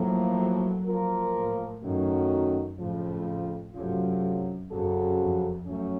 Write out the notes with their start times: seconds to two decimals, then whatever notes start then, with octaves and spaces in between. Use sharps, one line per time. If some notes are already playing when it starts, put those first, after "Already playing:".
Already playing: A2 F3 F#3 A#3
0.87 F3 A#3 F4 A#4
1.34 A2
1.82 F#2 D#3 F#3 A3 C#4 F#4
2.79 F2 A2 C#3 F3
3.75 F#2 C3 F#3 A3 C#4 F4
4.71 F#2 C#3 F#3 C4 F#4 A4
5.19 F2
5.67 F#2 F#3 A3 C#4